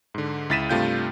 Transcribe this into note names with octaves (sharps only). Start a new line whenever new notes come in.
G#2 D3
C#2 E4 A6 B6 D#7 E7
G2 C3 A3 F4 G5 G6